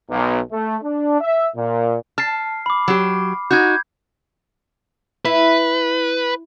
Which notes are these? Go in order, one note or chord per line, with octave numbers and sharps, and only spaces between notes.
B1
A3
D4
E5
A#2
A5 F6 C7
B5 D6
F#3 G4
D#4 F#4 G6 G#6
E4 B4